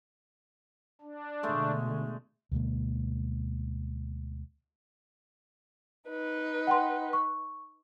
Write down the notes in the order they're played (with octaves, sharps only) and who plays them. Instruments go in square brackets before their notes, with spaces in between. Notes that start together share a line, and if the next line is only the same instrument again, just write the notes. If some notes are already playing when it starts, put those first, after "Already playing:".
[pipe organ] D4
[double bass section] B2 D3 [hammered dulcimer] G#3 A3
[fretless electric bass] D2 B2 G#3 A#3
[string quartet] D#4 B4
[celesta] F#5 G5 C6
C#6